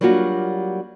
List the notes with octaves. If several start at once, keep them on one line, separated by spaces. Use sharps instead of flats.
F#3 G3 A#3 D4 F4 F#4